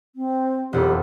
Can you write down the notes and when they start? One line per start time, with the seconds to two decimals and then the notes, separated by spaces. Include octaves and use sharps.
0.16 C4
0.73 E1 F2 E4 G4